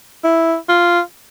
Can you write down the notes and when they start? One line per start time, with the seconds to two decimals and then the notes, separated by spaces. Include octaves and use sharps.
0.24 E4
0.69 F4